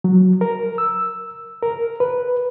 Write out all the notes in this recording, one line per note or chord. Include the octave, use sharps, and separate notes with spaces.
F#3
A#4
E6
A#4
B4